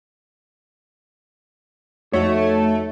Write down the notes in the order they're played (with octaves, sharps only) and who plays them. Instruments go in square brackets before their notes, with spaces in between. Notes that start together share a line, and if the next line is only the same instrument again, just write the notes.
[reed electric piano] F2 D#4 F#4 [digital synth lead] A3 [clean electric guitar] C#5